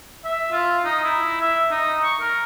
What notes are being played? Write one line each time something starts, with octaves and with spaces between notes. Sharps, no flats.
E5
F4
D#4
E4
E5
D#4
C#6
A#4